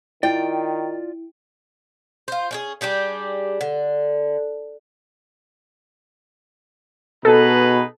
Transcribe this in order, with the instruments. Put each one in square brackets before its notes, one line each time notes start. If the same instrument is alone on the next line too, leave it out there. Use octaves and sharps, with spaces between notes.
[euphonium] D#3 [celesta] E4 [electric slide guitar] F4 D5 [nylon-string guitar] G5
[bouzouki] F4 C5
C#4 D#4 G#4
G3 D4 G4 G#4
D3
[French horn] B2 [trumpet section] D#4 G#4 B4 [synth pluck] A4